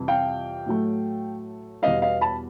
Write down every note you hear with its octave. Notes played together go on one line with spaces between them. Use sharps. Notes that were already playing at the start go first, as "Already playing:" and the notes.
Already playing: F2 C3 E3 G3
F5 G5
A2 F#3 A3
E2 B2 G3 B3 D#5 F5
D#5 F5
A5 B5